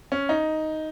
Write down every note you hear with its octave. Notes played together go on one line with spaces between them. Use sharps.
C#4
D#4